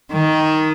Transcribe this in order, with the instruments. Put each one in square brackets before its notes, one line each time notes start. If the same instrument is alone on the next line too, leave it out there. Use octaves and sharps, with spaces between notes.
[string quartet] D#3